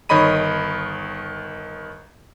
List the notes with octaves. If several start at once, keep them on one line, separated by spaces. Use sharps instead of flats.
G1 D#3 C#5 D#5 B5 D#7